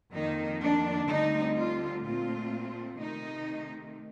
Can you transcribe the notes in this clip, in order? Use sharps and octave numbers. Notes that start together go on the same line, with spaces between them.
F2 D#3 A#3 D#4
D4
D2 D3 G3 C4 D#4
F4
A#2 A3 C4 F4
C3 D#3 A3 D#4